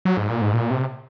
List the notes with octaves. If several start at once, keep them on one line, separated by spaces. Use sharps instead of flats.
F#3
G#2
A#2
G#2
A#2
C3